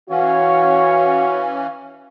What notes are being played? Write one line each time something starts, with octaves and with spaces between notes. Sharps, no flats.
E3 C#4 F#4 C#5 F5